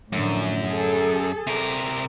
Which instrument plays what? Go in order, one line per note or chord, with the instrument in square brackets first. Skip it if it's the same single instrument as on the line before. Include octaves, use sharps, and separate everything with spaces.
[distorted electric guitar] F#2 [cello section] A2 D3 F3
[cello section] G#4 A4
[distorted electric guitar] C3 A#4